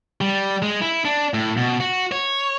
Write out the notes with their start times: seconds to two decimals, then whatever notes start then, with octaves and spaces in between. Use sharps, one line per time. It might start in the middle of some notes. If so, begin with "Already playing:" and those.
0.21 G3
0.62 G#3
0.81 E4
1.05 D4
1.34 A2
1.57 B2
1.80 F#4
2.12 C#5